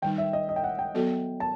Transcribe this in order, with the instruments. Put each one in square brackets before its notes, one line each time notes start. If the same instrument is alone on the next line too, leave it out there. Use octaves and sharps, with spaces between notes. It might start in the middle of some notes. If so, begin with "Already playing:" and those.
[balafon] D#3 G3 D#4 [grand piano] G5
[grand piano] E5
D#5
D#5
G5
F#5
G5
[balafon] F#3 B3 F#4 A4
[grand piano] A5